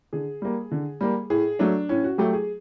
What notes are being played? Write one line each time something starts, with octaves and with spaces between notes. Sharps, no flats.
D3 G#4
G3 A#3
D3
G3 A#3
A2 G#4
F#3 A3 D4
A2 C#4
F#4
F#3 A3 G4
G#4